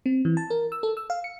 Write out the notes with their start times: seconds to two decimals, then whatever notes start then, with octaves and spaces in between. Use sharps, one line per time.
0.06 C4
0.25 E3
0.37 A5
0.50 A#4
0.72 E6
0.83 A4
0.97 E6
1.10 F5
1.24 C#7